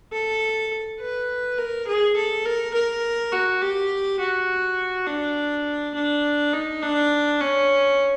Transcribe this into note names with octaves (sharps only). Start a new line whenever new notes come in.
A4
B4
A#4
G#4
A4
A#4
A#4
F#4
G4
F#4
D4
D4
D#4
D4
C#4